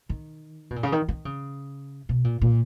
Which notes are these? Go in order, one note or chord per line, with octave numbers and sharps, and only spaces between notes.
D#3
B2
A#2
C#3
D#3
D#3
C#3
B2
A#2
A#2